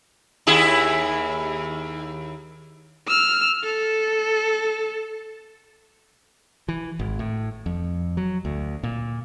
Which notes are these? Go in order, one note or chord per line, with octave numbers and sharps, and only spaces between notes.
D#2 E4 G#4
E6 F6
A4
E3
G#1
A2
F2
F#3
D2
A#2